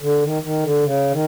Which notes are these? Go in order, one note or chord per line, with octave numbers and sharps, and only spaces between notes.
D3
D#3
D#3
D3
C#3
D#3